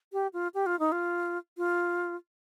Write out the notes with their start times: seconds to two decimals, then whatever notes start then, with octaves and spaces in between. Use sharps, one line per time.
0.13 G4
0.33 F4
0.54 G4
0.66 F4
0.79 D#4
0.92 F4
1.58 F4